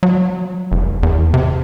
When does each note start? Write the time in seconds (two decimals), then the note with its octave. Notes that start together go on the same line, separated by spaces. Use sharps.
0.03 F#3
0.72 F1
1.03 E2
1.34 C3